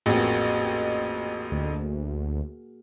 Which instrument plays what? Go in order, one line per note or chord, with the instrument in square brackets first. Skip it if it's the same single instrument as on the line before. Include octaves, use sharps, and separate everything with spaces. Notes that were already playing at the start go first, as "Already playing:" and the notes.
[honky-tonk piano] A1 F2 [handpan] A#3 F#4 G#4
[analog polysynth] D2